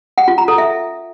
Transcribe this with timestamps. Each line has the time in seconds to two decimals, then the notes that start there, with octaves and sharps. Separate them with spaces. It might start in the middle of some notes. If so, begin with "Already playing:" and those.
0.18 F#5
0.28 F4
0.38 A#5
0.48 A4
0.58 E5